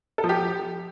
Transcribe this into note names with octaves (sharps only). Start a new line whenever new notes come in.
A4
F3
G4